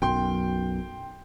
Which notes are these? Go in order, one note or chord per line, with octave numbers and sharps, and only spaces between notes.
B1 F#2 G5 C6